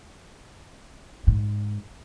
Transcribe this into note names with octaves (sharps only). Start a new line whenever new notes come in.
G#2